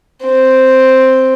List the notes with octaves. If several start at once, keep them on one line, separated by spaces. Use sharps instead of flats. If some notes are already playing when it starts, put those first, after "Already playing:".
C4